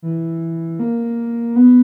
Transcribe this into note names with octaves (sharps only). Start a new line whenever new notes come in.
E3
A#3
B3